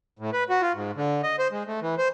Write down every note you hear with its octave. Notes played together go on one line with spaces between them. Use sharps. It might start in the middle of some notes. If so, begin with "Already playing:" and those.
A2
B4
F#4
F4
G#2
D3
D#5
C5
G#3
A3
E3
C5